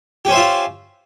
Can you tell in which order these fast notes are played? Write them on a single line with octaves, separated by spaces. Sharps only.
G4 C#4 C5 E5 F4